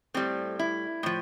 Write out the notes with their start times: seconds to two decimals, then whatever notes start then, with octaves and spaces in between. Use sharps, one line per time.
0.14 A2 G3 C4
0.59 E4
1.03 A2 F3